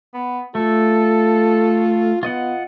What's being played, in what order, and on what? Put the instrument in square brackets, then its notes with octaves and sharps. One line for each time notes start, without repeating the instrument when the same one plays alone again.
[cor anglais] B3
[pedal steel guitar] A3 [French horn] F4 [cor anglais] A4
[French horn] B3 [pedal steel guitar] F4 D#5 F#5